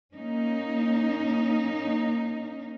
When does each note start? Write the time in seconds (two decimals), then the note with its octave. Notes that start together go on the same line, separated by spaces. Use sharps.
0.15 A#3 C#4 D#4